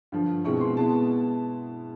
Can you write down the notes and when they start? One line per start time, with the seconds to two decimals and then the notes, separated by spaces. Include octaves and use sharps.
0.12 G2 D3 F3
0.44 B2 G#3 C4 E4 C#6
0.61 C6
0.77 B2 G#3 B3 E4 A5